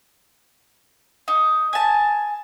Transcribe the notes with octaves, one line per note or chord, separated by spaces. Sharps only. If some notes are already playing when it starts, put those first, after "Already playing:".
D#4
G#5 A5